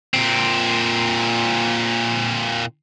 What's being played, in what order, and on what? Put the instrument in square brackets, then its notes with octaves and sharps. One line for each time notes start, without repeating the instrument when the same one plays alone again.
[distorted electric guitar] A#2 C4